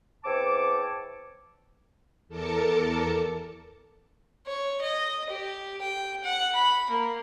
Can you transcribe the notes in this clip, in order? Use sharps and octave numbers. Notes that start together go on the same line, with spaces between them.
E2 C4 C#5 A5 D6
E2 A4 A#4 A5 D6 C#7
C#5
D#5
G4
G5
F#5
B5
A#3